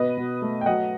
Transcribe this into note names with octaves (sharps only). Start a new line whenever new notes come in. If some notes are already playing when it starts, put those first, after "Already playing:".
Already playing: B2 B3 B4 D#5
B2
A3
G5
F#3 D#5 F#5